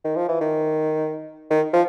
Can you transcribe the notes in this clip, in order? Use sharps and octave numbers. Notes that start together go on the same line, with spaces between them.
D#3
F3
E3
D#3
D#3
F3